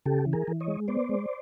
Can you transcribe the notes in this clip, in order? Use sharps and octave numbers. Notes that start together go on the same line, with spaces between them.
C#3 G4 A4
E3
G#4 A#4
E3
C#5 D#5
G#3
B3 C5 D5
G#3